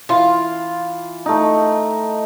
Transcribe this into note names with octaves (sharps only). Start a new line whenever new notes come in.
E3 F4
A3 D#4